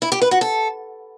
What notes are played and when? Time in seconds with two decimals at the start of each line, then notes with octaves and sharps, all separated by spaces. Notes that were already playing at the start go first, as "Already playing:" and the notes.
0.02 E4
0.12 G4
0.22 B4
0.31 F#4
0.41 A4